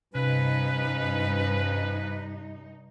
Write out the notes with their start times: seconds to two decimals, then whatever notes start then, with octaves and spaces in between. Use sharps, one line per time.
0.15 G2 C3 F3 C#4 D#4 B4